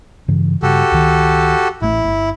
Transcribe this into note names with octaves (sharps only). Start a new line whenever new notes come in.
G2 C#3 E3
G2 C#3 F#4 G4 A4
C#2 D#3
A1 A3 E4
G1